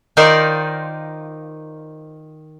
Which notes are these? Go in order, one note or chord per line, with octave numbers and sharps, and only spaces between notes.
D#3 D#4 F4 A#4 C5 D5